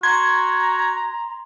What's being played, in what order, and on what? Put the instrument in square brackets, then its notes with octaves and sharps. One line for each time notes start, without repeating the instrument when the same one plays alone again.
[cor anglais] F#4 [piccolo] A#5 [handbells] C6 [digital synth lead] G#6